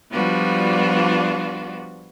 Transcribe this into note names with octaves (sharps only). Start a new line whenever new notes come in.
F3 G3 B3 D4 F4 F#4